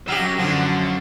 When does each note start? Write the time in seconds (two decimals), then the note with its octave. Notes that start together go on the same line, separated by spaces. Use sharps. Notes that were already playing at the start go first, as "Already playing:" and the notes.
0.08 F#3 G4 E5 F5
0.20 F#2
0.38 F#2 D3 F3 F#3